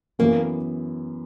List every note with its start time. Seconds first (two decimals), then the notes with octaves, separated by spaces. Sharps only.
0.19 F#2 E3 A#3 B3